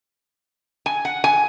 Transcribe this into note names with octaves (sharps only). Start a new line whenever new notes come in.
G#5
F#5
G#5